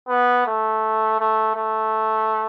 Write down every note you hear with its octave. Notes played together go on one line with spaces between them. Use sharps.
B3
A3
A3
A3